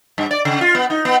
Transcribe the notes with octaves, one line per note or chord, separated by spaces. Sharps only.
G2
D5
C#3
F4
B3
D#4
B3